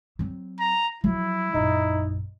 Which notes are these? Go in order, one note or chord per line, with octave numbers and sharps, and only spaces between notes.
F#3 C4
A#5
F3 F#3 E4
A#1 F#2 D#4